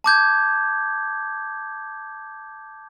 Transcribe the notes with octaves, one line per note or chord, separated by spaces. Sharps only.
A5 D6 G6 G#6